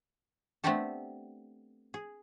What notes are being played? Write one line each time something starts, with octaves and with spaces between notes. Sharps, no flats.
A3 B3 C4 D4 G4 A4
G#4